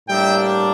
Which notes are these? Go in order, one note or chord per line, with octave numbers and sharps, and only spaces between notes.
A2 G3 A#3 D4 E5 G5